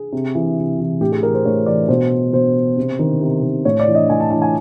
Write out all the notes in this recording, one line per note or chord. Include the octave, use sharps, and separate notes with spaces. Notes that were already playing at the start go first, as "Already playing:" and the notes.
Already playing: G#4
C3
E3
C3
E3
A2 G4
G#4
E3 A#4
C5
A2 C#5
E3 D5
B2 C5
B2 C5
C3
D#3
C3
D#3
A2 C#5
D5
E3
D#5
A2 G#5
A5
E3 A5
G#5